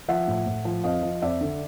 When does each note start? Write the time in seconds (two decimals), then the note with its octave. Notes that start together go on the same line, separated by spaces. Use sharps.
0.08 F3 E5 F#5
0.28 A2
0.46 A2
0.65 F3
0.84 F2 D#5 F5
1.03 F3
1.22 F2 D5 E5
1.41 D3